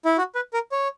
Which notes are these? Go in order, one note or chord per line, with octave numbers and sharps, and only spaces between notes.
E4
F#4
B4
A#4
C#5